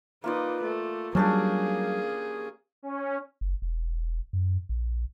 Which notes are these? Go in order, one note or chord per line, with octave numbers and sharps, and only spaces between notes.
A#3 D#4 F4 B4 D5
A3
F#3 G3 A#3 C#4 D4 G4 G#4
C#4
F#1
E1
F#2
A#1